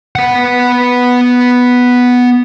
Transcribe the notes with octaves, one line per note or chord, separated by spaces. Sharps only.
B3 F#5